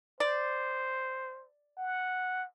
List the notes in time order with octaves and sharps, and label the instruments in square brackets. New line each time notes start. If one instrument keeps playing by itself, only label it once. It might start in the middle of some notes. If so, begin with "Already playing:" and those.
[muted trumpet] C5 [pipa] D5
[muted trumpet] F#5